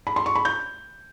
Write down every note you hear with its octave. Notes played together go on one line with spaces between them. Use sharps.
B5
C6
C#6
B5
G6